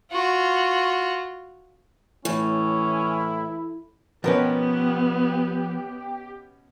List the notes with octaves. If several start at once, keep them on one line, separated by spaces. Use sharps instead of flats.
F4 F#4
A2 E3 C#4 E4
B2 F3 B3 C#4 G4 A#4 B4